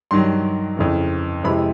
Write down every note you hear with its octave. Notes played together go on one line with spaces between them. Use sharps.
G2 D#3 F#3 C6
F2 C#3 E3
F2 C3 E3 G#3 B5